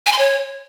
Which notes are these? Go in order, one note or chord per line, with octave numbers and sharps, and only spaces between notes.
G#5
C6
C#5